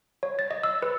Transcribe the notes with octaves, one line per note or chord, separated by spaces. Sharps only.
C#5
A6
D#5
E6
B4